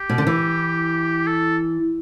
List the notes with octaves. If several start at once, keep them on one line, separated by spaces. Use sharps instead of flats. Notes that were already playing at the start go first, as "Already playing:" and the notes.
Already playing: G4
B2
D3
E3
A4